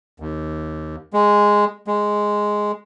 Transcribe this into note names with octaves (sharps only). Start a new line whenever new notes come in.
D#2
G#3
G#3